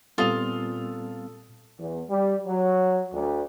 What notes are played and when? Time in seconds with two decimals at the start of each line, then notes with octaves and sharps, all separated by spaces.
0.18 A#2 G3 B3 C4 F4 A4 D#6 F7
1.79 E2
2.10 G3
2.46 F#3
3.13 D2